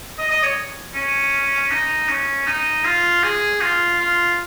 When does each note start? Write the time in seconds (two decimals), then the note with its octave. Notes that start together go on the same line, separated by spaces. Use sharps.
0.18 D#5
0.30 D#5
0.43 C#5
0.94 C#4
1.71 D#4
2.09 C#4
2.47 D#4
2.85 F4
3.23 G#4
3.61 F4
4.00 F4